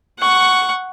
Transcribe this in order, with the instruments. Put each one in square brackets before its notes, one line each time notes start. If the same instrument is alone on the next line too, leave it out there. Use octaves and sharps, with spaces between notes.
[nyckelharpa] F#5 C#6